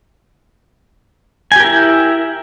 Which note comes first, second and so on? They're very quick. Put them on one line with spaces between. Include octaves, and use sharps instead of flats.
G#5 G4 A#4 E4